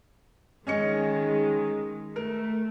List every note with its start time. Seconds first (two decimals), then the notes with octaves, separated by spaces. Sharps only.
0.67 D#3 G#3 C#4 D#5 C#7
2.16 A3 A#4